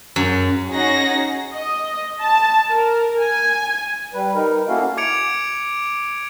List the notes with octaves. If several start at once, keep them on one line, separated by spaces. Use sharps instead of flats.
F#2
C#4 D#4 F#4 G#4 F#5 A#6
D#5
A5
A#4
G#5
G3 B4
D#4 A#4
A#3 C#4 E4 F#4 A4 F5
D6 G#6 C#7 D7 F7